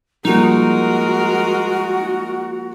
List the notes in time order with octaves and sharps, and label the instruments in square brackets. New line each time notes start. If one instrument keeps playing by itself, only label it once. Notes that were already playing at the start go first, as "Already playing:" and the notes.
[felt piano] F3 G3 A#3 [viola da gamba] G#3 A#4 [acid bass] D#4 [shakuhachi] F#4